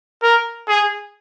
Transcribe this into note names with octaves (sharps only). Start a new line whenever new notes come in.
A#4
G#4